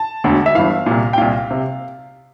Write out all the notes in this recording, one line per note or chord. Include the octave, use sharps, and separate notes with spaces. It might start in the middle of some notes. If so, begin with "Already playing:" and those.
Already playing: A5
E1 D2 D3
E5
G1 G2 E3 F5
C2 A#2
G5
C2 A#2 F5
C3